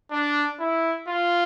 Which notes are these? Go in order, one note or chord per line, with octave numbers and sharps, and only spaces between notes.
D4
E4
F4